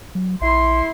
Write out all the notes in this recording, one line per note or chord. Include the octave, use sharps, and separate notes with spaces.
F#3
A#1 E4 C6